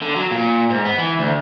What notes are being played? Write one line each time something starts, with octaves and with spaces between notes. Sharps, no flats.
D3
F#3
A#2
G#2
B3
E3
D2